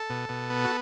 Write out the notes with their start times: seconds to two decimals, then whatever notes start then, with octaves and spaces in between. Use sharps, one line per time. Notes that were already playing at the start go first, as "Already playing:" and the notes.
Already playing: A4
0.10 B2
0.29 B2
0.50 B3
0.65 F#4